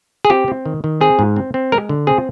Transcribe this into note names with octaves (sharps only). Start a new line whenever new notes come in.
G#4
C4 G4
C4
D#3
D#3
C4 G#4
G#2
C4
C4
G#3 A#4
D3
C4 G#4